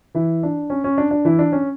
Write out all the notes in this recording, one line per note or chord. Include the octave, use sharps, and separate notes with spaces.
E3 E4
D4
C#4
C#4
D4
D4
E3 E4
D4
C#4